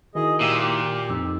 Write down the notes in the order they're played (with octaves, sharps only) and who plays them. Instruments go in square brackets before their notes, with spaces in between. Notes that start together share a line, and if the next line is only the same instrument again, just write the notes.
[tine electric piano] D#3 E4 F#4 [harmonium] G#4 D#5
[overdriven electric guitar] A#2 [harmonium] G4 E5
[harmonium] G4
[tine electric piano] F2 D#4 E6